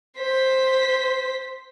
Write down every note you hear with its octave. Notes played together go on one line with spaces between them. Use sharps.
C5 B6